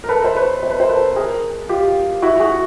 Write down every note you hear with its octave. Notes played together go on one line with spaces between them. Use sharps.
A#4
A4 B4
C5
B4 C#5
C5
B4
A#4 C5
A4 B4
G#4 A#4
F4 G4
E4 F#4
F#4 G#4